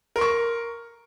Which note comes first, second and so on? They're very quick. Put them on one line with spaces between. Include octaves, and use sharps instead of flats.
A#4 C6 C#6